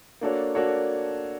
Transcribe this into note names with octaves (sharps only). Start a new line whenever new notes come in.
A#3 D4 F#4 A4 C#5
A#3 D4 F#4 A4 C#5